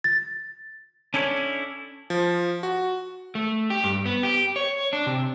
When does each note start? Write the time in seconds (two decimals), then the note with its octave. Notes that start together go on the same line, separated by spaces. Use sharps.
0.04 A6
1.14 C#4 D4 E4 A4 C5 C#5
2.10 F3
2.63 F#4
3.35 A3
3.70 G4
3.84 G2
4.05 B3
4.23 G4
4.56 C#5
4.93 D4
5.07 C3